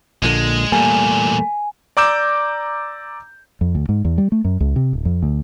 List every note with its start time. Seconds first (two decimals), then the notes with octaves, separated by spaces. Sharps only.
0.23 A#1 A#2 D3 G#3
0.72 E2 A#2 G3 A3 A#3 G#5
1.97 D5 A#5 D6 E6 G6 E7
3.61 F2
3.75 D2
3.89 G#2
4.05 E2
4.18 G3
4.32 A3
4.45 F#2
4.60 C#2
4.76 C3
4.93 D1
5.05 F2
5.23 D2